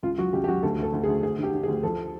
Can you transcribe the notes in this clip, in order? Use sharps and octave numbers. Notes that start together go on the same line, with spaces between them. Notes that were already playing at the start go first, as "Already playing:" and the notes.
C#2 F4
F#3 F#4
C#2 G4
G4
F#3 F#4
D2 A4
D2 A4
D2
G#4
D2
D2 G#4
D3 G4
D3
G#4
D2
F3 A4